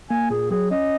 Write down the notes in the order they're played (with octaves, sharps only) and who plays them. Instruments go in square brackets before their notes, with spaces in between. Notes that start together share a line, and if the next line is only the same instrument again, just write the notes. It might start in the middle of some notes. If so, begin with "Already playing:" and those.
[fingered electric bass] A#3 [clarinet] G#5
[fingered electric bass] A#2 [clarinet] G#4
[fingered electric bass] F#3 [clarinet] G#4
[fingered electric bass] C#4 [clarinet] D#5